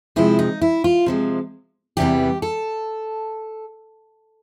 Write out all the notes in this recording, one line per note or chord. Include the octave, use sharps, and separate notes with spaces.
C3 F3 G#3 E4
D#4
E4
F4
C3 F3 G#3
E2 C3 E3 G3 B3 G4
A4